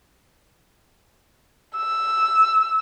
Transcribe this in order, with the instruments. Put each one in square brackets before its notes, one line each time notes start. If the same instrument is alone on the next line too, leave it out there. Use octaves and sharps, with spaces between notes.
[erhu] E6